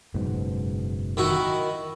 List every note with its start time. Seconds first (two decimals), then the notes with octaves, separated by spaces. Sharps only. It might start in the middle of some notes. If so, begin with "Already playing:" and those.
0.14 F#1 G#2 B2
1.17 D#3 E4 F#4